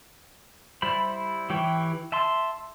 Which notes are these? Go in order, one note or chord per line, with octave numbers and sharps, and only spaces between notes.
G3 E4 C5 B5
E3 G4 C#5 G5
E5 A5 C6